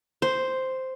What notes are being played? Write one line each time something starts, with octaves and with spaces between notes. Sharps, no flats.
C5